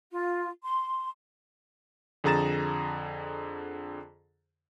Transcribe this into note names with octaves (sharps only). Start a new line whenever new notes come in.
F4
C6
F2 D3 G#4 A#5 A6 E7